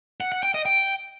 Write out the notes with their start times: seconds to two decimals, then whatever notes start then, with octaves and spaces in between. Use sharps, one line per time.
0.21 F#5
0.32 F#5
0.43 G5
0.54 D#5
0.66 G5